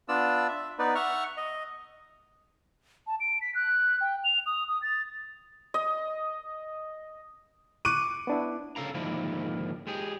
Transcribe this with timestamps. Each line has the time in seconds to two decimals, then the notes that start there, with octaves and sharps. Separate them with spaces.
0.09 B3 D4 F4 D5 E6
0.48 E5
0.79 B3 D#4 B4 D5
0.95 E5 F#5 C#6 F6
1.37 D#5
3.07 A5
3.20 D7
3.41 B6
3.55 F#6
4.01 G5
4.24 F7
4.46 D#6
4.68 D#6
4.82 A6
5.74 D#5
7.85 C#6 D6 F#6 D#7
8.27 B3 D4 E4
8.76 C#3 A4 F5 A#5
8.95 G#2 D3 D#3 F3 A#3 E4
9.87 G#3 G4 G#4